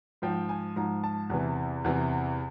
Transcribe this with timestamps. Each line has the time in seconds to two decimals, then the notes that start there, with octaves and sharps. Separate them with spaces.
0.22 G#2 F3 G5
0.49 G#5
0.76 G#2 F3 A#5
1.04 A5
1.30 E2 C3 E3
1.84 E2 C3 E3